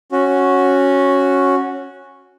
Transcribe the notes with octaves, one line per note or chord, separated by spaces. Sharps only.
C#4 F#4